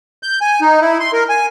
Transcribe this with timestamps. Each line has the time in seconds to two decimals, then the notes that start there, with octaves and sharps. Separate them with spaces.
0.23 G6
0.41 G#5
0.61 D#4
0.81 E4
1.00 C6
1.13 A#4
1.29 G#5